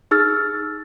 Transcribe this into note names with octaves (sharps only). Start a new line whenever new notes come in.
D#4 G#4 E6 F6 A6